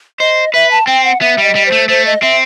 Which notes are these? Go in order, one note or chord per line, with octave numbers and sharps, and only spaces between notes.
C5 D#5
B4 E5
A5
C4 G5
F#5
B3 E5
G3
D#5
G3
C5
A3
A3 C5
D#5
C4 E5